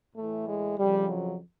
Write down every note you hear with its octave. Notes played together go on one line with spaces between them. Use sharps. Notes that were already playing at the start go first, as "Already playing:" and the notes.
A2 E3 A3
G#3
F2 C#3 F3 G3
F#3